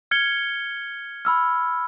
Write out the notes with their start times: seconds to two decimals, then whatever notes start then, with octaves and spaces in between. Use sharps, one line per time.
0.11 F6 G#6 C#7 G7
1.25 B5 E6 F6